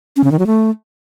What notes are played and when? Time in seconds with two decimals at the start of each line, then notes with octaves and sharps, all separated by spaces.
0.16 C#4
0.24 C#3
0.32 D#3
0.39 F#3
0.47 A3